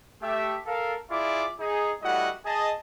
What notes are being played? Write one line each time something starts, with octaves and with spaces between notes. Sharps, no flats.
A3 G4 E5
A4 A#4 F5
E4 F4 G#4 D5 D6
D#4 G#4
G3 A3 E4 F#4 D#5 F#5
G#4 D#5 A5